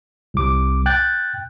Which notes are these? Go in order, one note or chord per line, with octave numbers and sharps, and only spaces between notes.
C2 D6
G5 F#6 G6 A6